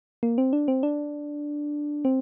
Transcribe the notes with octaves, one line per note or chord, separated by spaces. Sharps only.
A#3
C4
D4
C4
D4
C4